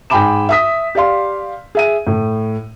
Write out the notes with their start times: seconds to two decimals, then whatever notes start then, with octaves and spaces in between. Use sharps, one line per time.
0.10 G#2 G5 G#5 B5 D6 E7
0.49 E5 D#6 B6
0.95 G4 D5 F5 C6
1.75 G#4 E5 D#7
2.07 A2